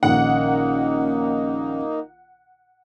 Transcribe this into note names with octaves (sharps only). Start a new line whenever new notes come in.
A#1 A#2 D#3 A#3 C#4 D#4 F#5